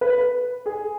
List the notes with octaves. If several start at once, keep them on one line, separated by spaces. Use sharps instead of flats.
B4
G#4